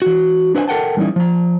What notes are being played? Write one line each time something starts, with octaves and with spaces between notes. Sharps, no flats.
E3 F#4
D4 B4 C5 F#5 G#5
A4 A#4 F#5 G5 A5
E3 G3 C#4 D#4 E4
F3 A#5